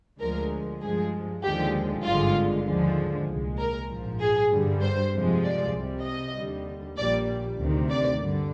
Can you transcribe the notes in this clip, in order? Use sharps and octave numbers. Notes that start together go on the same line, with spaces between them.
D2 D3 F3 G#3 A#4
G2 F3 G#3 G#4
D#2 D3 F3 G#3 G4
G#1 G2 D3 G#3 F4
D#2 D3 F3 G#3
C2 A#2 G#3
A#4
A#1 G#2 F3
G#4
G2 D3 G3
C5
F2 C3 F3 G#3
D5
C2 C3 G3
D#5
D#2 D3 G3
A#1 A#2 G3 D5
D2 C3 D#3
D5
G2 D3